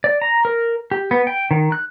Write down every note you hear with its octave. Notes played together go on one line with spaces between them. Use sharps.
D5
A#5
A#4
G4
B3
G5
D#3
F#6